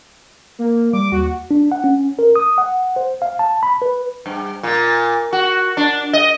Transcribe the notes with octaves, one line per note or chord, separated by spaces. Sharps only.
A#3
G3 D6
D#2 F#4
D4
F#5
C#4
A#4
D#6
F#5
C5
F5
A5
B5
B4
G2
A#2
F#4
D4
D#5